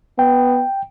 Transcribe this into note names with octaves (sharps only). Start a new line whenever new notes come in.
B3 G5